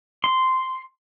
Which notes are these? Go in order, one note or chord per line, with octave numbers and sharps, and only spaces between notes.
C6